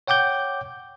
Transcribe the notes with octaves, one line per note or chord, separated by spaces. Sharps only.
C#5 F#5 G5 D6 G6